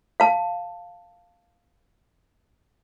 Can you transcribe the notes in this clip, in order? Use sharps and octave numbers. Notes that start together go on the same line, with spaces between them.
F5 A5